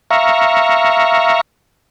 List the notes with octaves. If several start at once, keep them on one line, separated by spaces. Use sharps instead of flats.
E5 F5 A#5 C#6